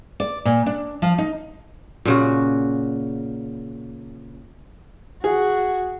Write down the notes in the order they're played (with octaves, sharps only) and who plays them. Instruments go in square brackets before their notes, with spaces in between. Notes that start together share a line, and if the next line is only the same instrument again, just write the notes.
[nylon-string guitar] D5
A#2
D4
F3
D#4
[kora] A#2 C#3 F#4
[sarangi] F#4 [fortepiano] G#4